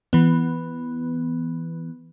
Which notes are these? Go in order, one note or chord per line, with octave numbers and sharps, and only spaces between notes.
E3 B3